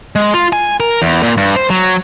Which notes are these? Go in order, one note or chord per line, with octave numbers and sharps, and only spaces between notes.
G#3
F4
G#5
A#4
E2
A#2
G2
C5
F#3